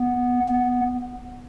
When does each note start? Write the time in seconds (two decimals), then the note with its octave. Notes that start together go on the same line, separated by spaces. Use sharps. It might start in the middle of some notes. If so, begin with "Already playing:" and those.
Already playing: B3
0.48 B3